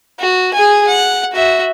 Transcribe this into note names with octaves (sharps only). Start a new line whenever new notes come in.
F#4
G#4 G#5
F#5
F#4 E5